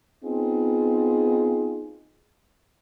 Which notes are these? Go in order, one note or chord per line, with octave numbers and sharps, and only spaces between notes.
B3 C4 D#4 F4 G#4